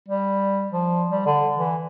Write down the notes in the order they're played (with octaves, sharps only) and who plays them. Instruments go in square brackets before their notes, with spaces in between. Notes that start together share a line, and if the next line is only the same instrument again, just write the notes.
[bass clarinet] G3
F3
G3
D3
E3